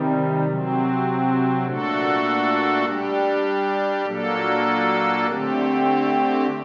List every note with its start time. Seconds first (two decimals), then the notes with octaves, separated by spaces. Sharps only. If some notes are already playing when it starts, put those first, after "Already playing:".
Already playing: C3 D#3 G3
0.45 C3 F#3 C4
1.66 A#2 A3 D4 F#4 A4
2.85 G3 D4 G4
4.06 A#2 F#3 A#3 D4 A4
5.27 D3 A3 C4 G4